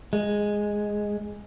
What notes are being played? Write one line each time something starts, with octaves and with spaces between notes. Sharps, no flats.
G#3